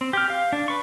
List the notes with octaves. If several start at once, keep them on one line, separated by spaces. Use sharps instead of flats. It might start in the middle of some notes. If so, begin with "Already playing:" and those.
C4
G4 F6
F5
D4
B4 C#6